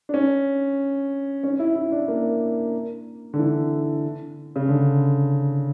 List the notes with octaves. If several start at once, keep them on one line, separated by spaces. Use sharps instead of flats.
D4
C#4
C#4
E4
E4
D4
A#3
D3
E3
C#3
D3